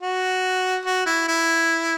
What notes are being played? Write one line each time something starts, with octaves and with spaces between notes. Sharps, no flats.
F#4
F#4
E4
E4